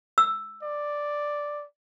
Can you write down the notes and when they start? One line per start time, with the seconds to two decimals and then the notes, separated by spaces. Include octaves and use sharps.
0.18 E6
0.63 D5